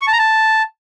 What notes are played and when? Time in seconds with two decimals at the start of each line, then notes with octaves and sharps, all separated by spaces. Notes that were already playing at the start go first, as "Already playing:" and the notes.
0.01 C#6
0.07 A5
0.13 A#5
0.18 A5